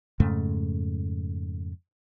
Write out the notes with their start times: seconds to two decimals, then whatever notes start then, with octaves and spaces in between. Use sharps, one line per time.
0.20 F2 G#2 C#3 A3